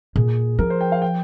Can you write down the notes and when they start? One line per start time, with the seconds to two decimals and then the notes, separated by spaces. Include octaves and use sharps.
0.16 A#2 G#4
0.59 F3 A#4
0.70 C5
0.81 G5
0.92 F5
1.02 G5